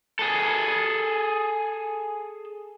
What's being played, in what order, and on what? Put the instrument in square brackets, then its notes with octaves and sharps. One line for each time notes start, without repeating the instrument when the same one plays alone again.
[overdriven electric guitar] G#4 A4